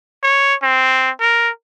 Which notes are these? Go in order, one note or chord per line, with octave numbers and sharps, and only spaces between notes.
C#5
C4
A#4